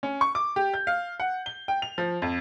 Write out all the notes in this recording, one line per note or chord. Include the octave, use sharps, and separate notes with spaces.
C#4
C#6
D6
G4
G6
F5
F#5
G7
G5
F7
F3
F2